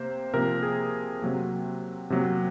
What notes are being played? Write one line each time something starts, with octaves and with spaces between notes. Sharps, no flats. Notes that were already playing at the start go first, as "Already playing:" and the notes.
Already playing: C3 A#3 C5
C3 F3 A#3 A#4
G#4
C3 F#3 A#3
C3 F#3 A#3